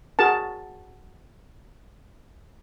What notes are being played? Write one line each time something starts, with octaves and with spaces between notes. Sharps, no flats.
F#4 G#4 A#4 A5